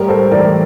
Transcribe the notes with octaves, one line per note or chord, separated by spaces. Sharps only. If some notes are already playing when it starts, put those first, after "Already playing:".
Already playing: A2 G3 A#4
A4 C5
E3 A#4 D5